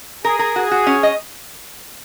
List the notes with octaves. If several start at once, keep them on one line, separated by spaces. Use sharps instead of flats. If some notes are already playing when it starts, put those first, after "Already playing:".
G#4 A#4
A#4
F#4 G#4
F#4
C#4
D#5